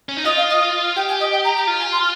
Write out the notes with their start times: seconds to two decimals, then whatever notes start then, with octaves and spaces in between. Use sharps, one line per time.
0.09 C#4
0.17 D#4
0.24 F4 D#5
0.36 F5
0.49 D#5
0.96 G4 G5
1.08 G#5
1.20 D#5
1.32 G5
1.44 A#5
1.56 A#5
1.67 F4
1.79 G#5
1.91 C6